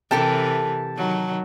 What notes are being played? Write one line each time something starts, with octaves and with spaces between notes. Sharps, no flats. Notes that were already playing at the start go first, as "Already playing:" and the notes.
C3 E3 G4 A4 A#4 A5
D#3 F#3